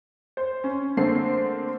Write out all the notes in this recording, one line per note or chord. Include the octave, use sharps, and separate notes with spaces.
C5
C#4
D3 A3 A#3 C4 C7